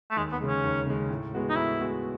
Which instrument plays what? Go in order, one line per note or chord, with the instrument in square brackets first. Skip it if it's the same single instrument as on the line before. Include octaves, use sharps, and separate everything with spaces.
[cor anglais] A3
[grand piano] D#2 [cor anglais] G#3
[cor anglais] B3
[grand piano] C#3 G#3
[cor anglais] C#4
[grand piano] D#2
C#3 G#3
A2
G#3 B3 F#4
[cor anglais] D#4
[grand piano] A2 [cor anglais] E4
[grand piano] G#3 B3 F#4